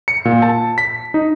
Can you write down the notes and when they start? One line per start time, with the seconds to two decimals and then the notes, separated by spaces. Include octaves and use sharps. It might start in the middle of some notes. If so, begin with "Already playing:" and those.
0.08 C#7
0.25 A#2
0.42 A5
0.78 B6
1.14 D#4